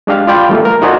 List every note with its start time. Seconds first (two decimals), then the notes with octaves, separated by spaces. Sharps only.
0.07 G#3 D4 G4 F5
0.27 F4 D5 G5 B5
0.49 E3 G3 A3 A#3
0.65 A#4
0.82 D#4 F4 F#4 C5 D5 G#5